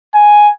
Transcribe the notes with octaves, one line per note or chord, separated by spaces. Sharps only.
G#5